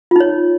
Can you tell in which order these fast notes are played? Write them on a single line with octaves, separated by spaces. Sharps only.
F4 D#4 C#5